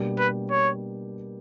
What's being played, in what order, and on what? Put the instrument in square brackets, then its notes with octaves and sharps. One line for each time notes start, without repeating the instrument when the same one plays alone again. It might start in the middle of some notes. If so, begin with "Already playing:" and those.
Already playing: [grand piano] B2 G3 A#3 D4 G4
[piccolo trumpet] B4
C#5